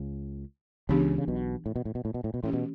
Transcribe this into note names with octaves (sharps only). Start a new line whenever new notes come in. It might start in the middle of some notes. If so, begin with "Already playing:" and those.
Already playing: C#2 C#3
C#2 C#3 E3 B3 D4 G4
C#3
B1 B2
A2
B2
A2
B2
A2
B2
A2
B2
A2 E3 A3 C#4 G4
B2